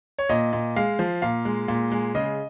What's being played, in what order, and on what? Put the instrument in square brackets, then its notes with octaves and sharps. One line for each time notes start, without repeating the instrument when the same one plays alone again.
[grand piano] C#5
A#2 D#5
A#2
G#3 F5
F3
A#2 F5
G#3
A#2
G#3
C#3 D#5